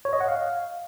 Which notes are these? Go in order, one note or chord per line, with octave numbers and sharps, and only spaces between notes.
C#5
D#5
F#5
F5